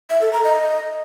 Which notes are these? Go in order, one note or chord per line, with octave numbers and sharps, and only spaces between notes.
E5
A4
A#5
D#5